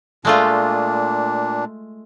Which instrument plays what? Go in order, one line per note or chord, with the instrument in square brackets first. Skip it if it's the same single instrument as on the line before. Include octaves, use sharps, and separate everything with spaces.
[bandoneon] A#2 D4 [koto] G#3 A3 F4